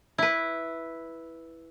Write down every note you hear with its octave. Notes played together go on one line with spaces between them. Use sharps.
E4 B4